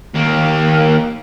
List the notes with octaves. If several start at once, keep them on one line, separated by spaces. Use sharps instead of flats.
D#2 A#3